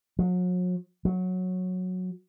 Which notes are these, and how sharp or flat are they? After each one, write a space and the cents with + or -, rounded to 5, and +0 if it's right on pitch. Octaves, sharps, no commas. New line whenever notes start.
F#3 -40
F#3 -10